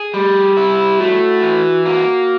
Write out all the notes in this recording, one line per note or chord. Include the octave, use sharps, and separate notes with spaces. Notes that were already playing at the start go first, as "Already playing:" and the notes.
Already playing: G#4
G3 G4
E4
A3 F#4
E3
A#3 F#4